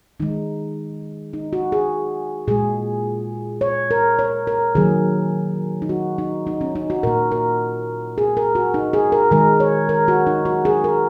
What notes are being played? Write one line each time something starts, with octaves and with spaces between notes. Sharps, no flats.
D#3 G#3 D#4
D#4
F#4
G#4
A#2 G#3 G#4
C#5
A#4
C#5
A#4
D#3 F#3 A#3 G#4
D#4
F#4
D#4
D#4
C#4
D#4
F#4
A#2 A#3 A#4
A#4
G#4
A#4
F#4
D#4
G#4
A#4
D#3 G#3 A#4
C#5
A#4
F#4
D#4
F#4
G#4
A#4